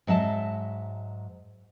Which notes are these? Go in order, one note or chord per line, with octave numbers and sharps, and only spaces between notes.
G#2 F#3 D#5 E5 A5